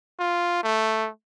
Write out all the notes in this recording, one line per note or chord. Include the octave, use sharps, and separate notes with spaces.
F4
A3